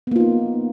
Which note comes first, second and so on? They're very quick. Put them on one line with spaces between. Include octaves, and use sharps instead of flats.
B3 A#3 F4 D#4